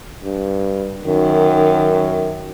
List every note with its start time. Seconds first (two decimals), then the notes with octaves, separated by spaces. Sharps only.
0.24 G2
1.06 F#2 D#3